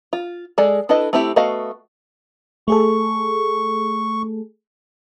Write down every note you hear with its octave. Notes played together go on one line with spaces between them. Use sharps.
F4
G#3 G#4 A4 D5
D4 E4 A4 B4 D#5
A3 C4 E4 G4
A3 B3 F#4 D#5 F5
A3 G#4 A4 C#6